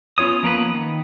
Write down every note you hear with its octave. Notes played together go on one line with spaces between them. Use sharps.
B3 C#4 F4 C#5 D#6
F3 A#3 B3 B4
D#3